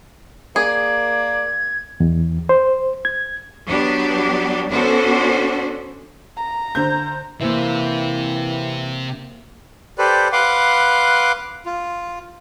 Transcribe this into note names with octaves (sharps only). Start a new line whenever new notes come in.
A#3 G#4 D5 G#6
E2
C5
G#6
F#3 B3 D4 G4
B3 C#4 D4 F#4 A4 C5
A#5
D3 C5 G6
C3 E3 A#3 C5 E5
G4 A4 B4 C5 D5
B4 F5 F#5 C6 D6
F4